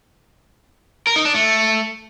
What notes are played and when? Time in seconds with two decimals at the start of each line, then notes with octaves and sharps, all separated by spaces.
1.07 A#4
1.16 D#4
1.25 D4
1.35 A3